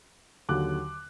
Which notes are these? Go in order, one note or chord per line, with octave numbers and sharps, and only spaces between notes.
D#2 D3 F#3 D6 F#6